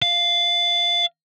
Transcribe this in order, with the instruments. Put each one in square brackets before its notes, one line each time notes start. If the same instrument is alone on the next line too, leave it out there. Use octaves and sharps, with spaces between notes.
[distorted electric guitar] F5